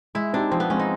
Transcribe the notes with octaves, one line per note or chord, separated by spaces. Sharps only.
G#3 E4
C4 D4 D#4 G4
F3 C4
B3
G#3 C4 C#4
D#4